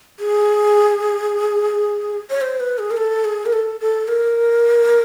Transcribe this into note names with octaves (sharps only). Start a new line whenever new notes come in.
G#4
C#5
C5
B4
G#4
A#4
A4
G#4
A#4
A4
A4
A#4